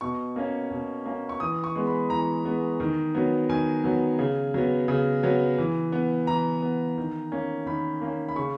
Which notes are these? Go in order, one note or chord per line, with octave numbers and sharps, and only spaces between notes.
B2 C#6
A#3 C#4
B2
A#3 C#4
C#6
E3 D#6
C#6
G#3 B3
B5
E3 A#5
G#3 B3
D#3
F#3 B3
D#3 G#5
F#3 B3
C#3
F#3 B3
C#3
F#3 B3
E3
B3
E3 A#5
B3
D#3
A#3 C#4
D#3 B5
A#3 C#4
B5
C#3 C#6